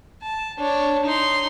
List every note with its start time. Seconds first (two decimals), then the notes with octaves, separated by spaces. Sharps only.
0.22 A5
0.58 D4 C#5
1.05 D#4 C6